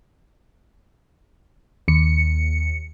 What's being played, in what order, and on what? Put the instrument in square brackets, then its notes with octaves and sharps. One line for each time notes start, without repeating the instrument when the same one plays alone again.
[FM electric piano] D#2 C#7